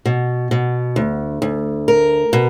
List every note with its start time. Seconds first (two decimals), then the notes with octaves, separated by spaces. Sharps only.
0.06 B2
0.51 B2
0.96 D2
1.42 D2
1.88 A#4
2.33 B2